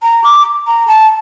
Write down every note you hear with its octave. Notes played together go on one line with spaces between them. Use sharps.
A#5
D6
A#5
A5